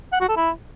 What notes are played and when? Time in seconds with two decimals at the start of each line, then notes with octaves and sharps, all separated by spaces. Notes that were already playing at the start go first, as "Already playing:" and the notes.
0.13 F#5
0.21 F#4
0.29 A4
0.37 E4